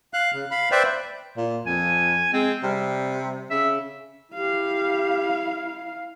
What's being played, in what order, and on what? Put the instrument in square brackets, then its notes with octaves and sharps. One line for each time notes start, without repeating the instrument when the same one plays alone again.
[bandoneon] F5 F#6
C#3
F5 B5
B4 C5 D5 E5 G5
[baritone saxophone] A#2
[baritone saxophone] F2 [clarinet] G#5
[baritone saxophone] G#3 [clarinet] C4
[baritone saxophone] C3 [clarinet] G3
[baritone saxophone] C#3 [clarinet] E5
[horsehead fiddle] E4 F5 [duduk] G4